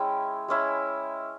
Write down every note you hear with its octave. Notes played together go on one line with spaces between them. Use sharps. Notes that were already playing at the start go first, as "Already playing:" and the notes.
Already playing: G#3 C#4 E4 G5
G#3 C#4 E4